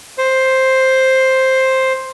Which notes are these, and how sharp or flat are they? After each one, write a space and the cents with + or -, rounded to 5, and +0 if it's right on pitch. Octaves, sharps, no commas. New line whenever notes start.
C5 +5